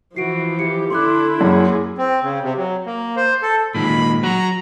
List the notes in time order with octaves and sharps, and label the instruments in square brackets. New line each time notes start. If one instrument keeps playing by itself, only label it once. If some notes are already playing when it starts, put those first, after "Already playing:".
[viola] E3 F3 [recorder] F#4 [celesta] C7 D7
[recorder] G4 [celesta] C#7
[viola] D3 D4 [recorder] E4 [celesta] C6 D6 F#6
[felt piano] F#2 [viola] A#3 G#4
[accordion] C4
C#3
C3
F#3
A#3
C5
A4
[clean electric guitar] A#2 D#3 G#3 [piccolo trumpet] B5
[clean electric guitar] F#3 F#4 [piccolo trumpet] A#5